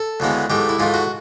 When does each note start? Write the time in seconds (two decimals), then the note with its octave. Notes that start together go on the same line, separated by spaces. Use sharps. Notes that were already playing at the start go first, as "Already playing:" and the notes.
Already playing: A4
0.20 D2 C#3 E3 G#3 B3
0.50 G#2 E3 A3 G4
0.69 E4
0.79 G#2 E3 A3 F4
0.94 F#4